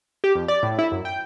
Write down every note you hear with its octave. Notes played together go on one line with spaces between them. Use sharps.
G4
F2
D5
A2
E4
F#2
G5